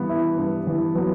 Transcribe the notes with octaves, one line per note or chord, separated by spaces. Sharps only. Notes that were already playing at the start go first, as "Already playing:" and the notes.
Already playing: G2 E3 G3 B3
E4
G2
E3
F#3 B3